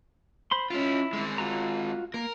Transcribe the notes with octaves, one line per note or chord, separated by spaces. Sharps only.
C5 B5 C6
C#4 E4 F4
G#3 C4
F4 F#4 A#5
A#3 A#4